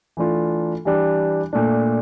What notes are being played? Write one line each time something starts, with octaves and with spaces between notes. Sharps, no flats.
E3 A3 D4 F4
E3 G3 D4 G4
A#2 A3 D4